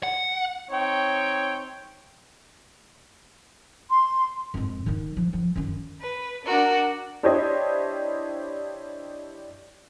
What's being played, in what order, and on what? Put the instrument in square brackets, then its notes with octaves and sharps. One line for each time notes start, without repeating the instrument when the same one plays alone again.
[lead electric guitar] F#5
[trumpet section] C4 D#4 C#5 G5
[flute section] C6
[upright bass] F2 G#2
D#3 D#4
F3
F3
F#2 D#3
[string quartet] B4
D4 F#4 A#4
[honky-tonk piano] D4 E4 G4 C5 C#5 D#5